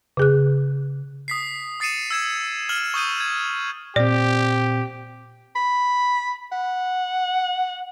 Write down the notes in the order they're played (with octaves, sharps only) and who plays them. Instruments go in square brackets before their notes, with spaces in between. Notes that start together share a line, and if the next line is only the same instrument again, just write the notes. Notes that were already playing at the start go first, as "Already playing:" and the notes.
[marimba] C#3 G#4 F#6
[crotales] D#6 B6 C7
D#6 A6 C7 C#7 D#7 E7
E6 G#6 E7
F6 E7 F#7
C#6 D#6 G6 D#7
G#6
[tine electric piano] A#2 C4 [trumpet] G4 [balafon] D5
[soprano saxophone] B5
F#5